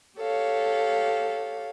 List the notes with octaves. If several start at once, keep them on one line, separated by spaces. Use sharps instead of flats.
G4 A4 C#5 F5